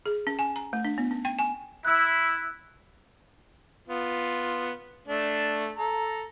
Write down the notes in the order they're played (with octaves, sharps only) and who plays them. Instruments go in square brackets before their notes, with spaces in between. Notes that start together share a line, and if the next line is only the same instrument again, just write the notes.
[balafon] G#4
C#4
G#5
A#5
A3
D4
B3
C#4
G5
G#5
[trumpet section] E4 [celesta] E6 F#6
[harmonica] B3 F4
A3 D4
A4 A#5